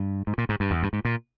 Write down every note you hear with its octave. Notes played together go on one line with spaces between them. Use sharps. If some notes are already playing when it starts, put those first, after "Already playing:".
Already playing: G2
G#2
A#2
G#2
G2
E2
G2
G#2
A#2